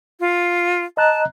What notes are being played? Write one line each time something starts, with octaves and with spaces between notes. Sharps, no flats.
F4
D#5 A5 A#5 F#6